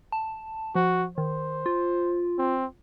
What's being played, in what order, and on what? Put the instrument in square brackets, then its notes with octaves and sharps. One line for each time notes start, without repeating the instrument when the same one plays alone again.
[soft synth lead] A5
[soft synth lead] F3 [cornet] F#4
[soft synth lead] D#3 [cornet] C5
[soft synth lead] F4
[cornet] C4